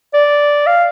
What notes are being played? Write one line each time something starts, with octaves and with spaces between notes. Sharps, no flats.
D5
F5